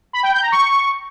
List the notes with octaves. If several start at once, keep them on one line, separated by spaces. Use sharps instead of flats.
B5
G5
G6
A#5
C#6